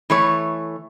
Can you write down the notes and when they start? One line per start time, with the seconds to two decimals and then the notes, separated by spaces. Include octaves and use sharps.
0.10 E3 A3 C#5